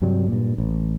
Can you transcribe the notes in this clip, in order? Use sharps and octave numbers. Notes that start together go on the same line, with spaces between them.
G2 C3 F#3 G3
G2 A#2
A1